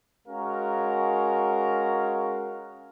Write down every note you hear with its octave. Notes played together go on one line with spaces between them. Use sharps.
G#3 C#4 F#4 A#4 F5 A#5